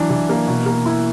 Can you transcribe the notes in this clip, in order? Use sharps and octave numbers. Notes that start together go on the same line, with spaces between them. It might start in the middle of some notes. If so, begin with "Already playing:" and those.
Already playing: E3 F#3 D4
E3
A#3
B2
A#3
E4